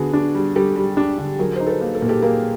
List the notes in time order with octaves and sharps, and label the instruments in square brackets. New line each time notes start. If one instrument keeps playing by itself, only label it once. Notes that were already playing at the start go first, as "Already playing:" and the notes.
Already playing: [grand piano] D3 B3 [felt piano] F#4 G#4
[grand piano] D4
G3
[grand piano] G3 [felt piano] G4 A4
[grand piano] G3
D4
D3
[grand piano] F#3 [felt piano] G#4 A#4
[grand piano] D#4 [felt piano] C5
[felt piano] A4 B4
[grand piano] A#3
[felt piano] A4
[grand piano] A#2 [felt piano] A#4
[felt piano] G4 A4
[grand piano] A#3 [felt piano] G#4 A#4